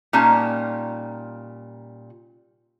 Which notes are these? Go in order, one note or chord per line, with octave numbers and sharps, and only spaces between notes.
A#2 G3 C#4 D#4 A5